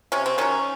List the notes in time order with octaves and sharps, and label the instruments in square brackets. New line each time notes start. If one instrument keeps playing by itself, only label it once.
[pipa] C3 C#4
C4
D#3 F#3 C#4